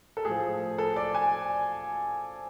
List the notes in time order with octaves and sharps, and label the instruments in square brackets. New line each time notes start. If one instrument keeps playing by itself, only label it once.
[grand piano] A4
A2 F3 G#4
A4
D5
G#5